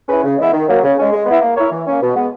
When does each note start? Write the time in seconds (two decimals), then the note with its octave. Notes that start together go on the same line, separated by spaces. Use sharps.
0.08 C#4 E4 G#4 B4
0.24 C#3
0.38 E3 G#3 B3 E4
0.53 D#3
0.68 F#3 A#3
0.83 C#3
0.98 G#3 C#4
1.12 G#3
1.26 B3 E4
1.42 A#3
1.56 E4 A#4 C#5
1.71 E3
1.86 A#3 C#4
2.01 B2
2.15 G#3 B3